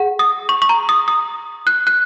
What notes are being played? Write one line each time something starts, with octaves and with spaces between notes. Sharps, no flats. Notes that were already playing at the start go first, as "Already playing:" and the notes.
Already playing: G#4 F#5
D#6
C#6
C#6
A#5
D#6
D#6
F#6
F#6